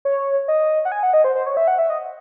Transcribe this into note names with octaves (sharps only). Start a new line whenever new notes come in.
C#5
D#5
F#5
G#5
F#5
D#5
C5
C5
C#5
E5
F#5
E5
D#5